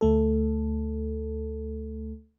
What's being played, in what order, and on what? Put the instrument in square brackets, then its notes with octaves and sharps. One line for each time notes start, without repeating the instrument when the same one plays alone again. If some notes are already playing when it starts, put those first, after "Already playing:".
[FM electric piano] D2 A3 A4